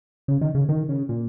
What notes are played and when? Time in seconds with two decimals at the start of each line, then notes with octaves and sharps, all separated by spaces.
0.28 C#3
0.41 D#3
0.55 C#3
0.69 D#3
0.89 C#3
1.09 A#2